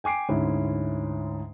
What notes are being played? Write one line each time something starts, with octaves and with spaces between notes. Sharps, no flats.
G5 G#5 D6 C7 D7
D2 G#2 C#4 E4